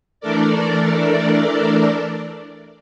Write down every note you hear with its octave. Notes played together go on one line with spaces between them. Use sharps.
E3 A3 D4 A4 A#4 D5